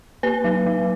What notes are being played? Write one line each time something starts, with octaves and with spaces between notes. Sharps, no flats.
A#3 B4
F#3
F#3